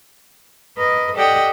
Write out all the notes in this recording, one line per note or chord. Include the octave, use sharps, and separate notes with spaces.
A#4 B4 D#5
G4 A4 D5 D#5 F#5 G5